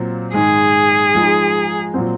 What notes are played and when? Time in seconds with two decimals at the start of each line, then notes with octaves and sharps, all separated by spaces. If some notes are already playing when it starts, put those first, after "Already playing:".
Already playing: A#2 F#3 C4 F4
0.34 G#2 D#3 G#3 G#4
1.15 F3 G#3 D#4
1.94 A#2 F#3 C4